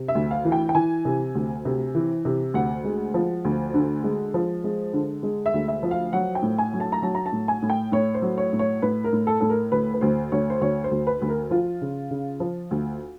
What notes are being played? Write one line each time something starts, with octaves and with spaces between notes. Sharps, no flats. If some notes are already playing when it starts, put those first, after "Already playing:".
Already playing: C3
E5
D2
F5
E3
G5
G5
E3 G#5
C3
D2
C3
E3
C3
D2 F#5
G#3
F3
D2
D3
G#3
F3
G#3
D3
G#3
E5
D2
E5
F3
F5
F#3 F#5
G5
A2
G#5
F#3
A5
A#5
F#3 A5
A#5
A5
A2
G#5
A2
G5
A2 C#5
C5
F#3
C#5
A2
C#5
A2 B4
A#4
A2
A4
A2 A4
A#4
D2 B4
B4
D2 C5
D2 C#5
C5
D2 C#5
C5
D2
B4
D2
A#4
F3 F4
C#3
C#3
F3
D2